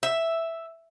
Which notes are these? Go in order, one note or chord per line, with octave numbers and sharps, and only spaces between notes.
E5